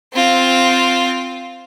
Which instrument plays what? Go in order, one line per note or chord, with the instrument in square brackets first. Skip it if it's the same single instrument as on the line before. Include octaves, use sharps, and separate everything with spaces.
[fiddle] C4 F4